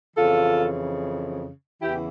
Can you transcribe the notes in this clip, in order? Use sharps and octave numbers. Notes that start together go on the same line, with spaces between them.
F2 C#3 E3 F4 A4
E2 C#3 E3 E4 G4